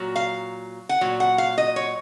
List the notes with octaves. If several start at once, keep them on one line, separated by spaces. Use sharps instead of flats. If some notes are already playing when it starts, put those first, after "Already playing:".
Already playing: A#2 F#3
F5
F#5
A#2 F#3
F#5
F5
D#5
C#5